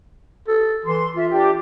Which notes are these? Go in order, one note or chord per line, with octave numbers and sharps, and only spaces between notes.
A4
E3 C6
F4 E5
D4 G4